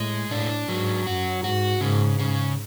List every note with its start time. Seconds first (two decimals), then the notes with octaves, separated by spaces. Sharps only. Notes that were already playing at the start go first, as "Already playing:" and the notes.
Already playing: A2 G#3
0.31 A2 D4
0.68 G#2 F#3
1.07 F#2 F#4
1.43 G#2 F#4
1.81 G#2 C#3
2.19 C#3